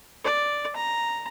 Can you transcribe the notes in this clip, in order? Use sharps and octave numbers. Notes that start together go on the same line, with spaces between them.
D5
A#5